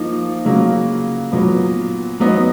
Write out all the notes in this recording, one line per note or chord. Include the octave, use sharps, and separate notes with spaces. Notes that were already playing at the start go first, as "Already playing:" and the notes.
Already playing: F3 A#3 D#4
C#3 F#3 A#3
A#2 F#3 B3
F#3 B3 D#4